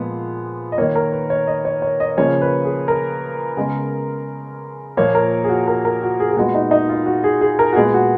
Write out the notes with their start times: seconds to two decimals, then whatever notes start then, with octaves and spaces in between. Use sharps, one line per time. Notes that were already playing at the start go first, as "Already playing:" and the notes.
Already playing: A#2 F3 G#3 B3
0.72 D#5
0.78 D#3 A#3 C#5
0.95 A#4
1.12 B4
1.30 C#5
1.47 D#5
1.65 C#5
1.82 C#5
2.00 D#5
2.17 C#3 F3 A#3 C#5
2.41 B4
2.65 G#4
2.88 A#4
3.57 C#3 G#3 B3
4.97 A#2 F3 A#3 C#5
5.15 A#4
5.44 G#4
5.49 F#4
5.67 A#4
5.85 A#4
6.02 F#4
6.20 G#4
6.31 G#4
6.37 A#2 G#3 B3 F#4
6.55 D#4
6.71 D#4
6.89 F4
7.06 F#4
7.24 G#4
7.41 G#4
7.59 A#4
7.73 F#4
7.76 A#2 G#3 B3 G#4
7.94 F#4